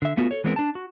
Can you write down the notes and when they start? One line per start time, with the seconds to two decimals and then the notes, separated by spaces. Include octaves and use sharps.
0.02 D3 E5
0.17 A3 B3 F4 F#4
0.31 A4 C#5
0.44 E3 G#3 B3 C4 E4 A#4
0.56 D4 A5
0.75 F#4